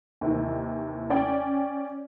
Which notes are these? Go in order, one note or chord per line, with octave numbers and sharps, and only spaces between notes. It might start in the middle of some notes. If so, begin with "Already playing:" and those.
D#2 C3 D#3 E3
C#4 D5 G5